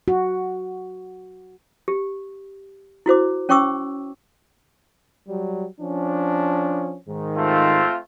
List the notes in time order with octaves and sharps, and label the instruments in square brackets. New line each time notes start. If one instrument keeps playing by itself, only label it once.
[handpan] F#4
[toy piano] G4
E4 F#4 C5 D6
C#4 C#5 G5 C#6 D6 E6
[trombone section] F#3 G3
F3 C#4 D4
G#2 D#3
[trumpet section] A3 C4 F4